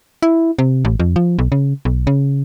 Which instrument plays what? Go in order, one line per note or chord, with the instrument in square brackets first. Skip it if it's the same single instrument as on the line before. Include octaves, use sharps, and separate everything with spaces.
[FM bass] E4
C3
A1
F2
F3
B1
C#3
B1
C#3